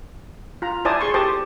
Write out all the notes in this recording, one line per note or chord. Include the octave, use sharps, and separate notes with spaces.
F4 A#5
E4 C5 D5 G#5 A5 D#6
G#4 C6 C#6
G4 A4 C5 A5 D#6